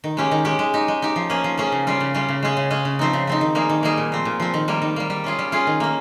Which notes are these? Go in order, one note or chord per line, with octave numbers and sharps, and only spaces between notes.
D#3
G#3 C#4 G4
D#3
G#3 C#4 G4
G#3
D#4 G4
G#3
D#4 G4
F3
A#3 C#4 G#4
F3
A#3 C#4 G#4
C#3
G3 C#4 F4
C#3
G3 C#4 F4
C#3
G#3 C#4 G#4
C#3
G#3 C#4 G#4
C#3
F3 C4 D#4
C#3
F3 C4 D#4
D#3
G3 A#3 D#4 G#4
D#3
G3 A#3 D#4 G#4
A#2
F3 C4
A#2
F3 C4
D#3
G3 A#3
D#3
G3 A#3
G3
C#4 F4 G#4
G3
C#4 F4 G#4
D#3
A#3 C#4